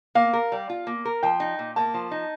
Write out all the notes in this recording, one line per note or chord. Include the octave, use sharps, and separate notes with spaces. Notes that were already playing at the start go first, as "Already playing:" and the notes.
A#3 F5
A#4
G3
F4
A#3
A#4
F3 G5
D#4
A#2
A#3 A5
F3
D#4